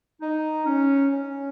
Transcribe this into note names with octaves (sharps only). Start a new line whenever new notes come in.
D#4
C#4
C#4